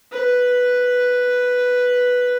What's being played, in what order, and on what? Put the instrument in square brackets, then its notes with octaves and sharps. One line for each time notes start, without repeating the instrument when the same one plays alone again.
[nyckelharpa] B4